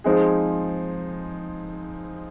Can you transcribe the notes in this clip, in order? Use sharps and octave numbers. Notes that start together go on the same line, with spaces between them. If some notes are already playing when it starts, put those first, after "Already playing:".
F3 G#3 C4 D#4 G#4